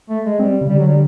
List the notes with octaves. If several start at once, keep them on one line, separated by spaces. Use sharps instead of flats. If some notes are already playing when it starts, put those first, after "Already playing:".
A3
G#3
G3 C4
C#3
D3 G3
F#3
G3